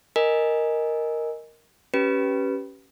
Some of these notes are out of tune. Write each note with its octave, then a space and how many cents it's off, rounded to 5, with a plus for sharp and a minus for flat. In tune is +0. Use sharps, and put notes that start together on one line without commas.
A#4 +0 D#5 +0 G#5 +0
C#4 +0 G4 -15 B4 -5